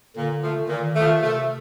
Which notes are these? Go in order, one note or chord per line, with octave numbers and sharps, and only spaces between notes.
A#2 D3
F3 A3
A#2 D#3
F3 A3
C3 A3